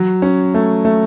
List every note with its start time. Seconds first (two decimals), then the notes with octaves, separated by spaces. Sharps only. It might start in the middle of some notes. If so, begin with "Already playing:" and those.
Already playing: F#3
0.22 C#4
0.54 A3
0.85 A3